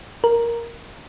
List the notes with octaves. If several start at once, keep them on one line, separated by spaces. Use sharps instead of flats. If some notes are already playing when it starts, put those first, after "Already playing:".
A#4